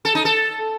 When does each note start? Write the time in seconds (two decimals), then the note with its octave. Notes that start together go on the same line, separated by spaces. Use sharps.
0.05 A4
0.15 D#4
0.25 A4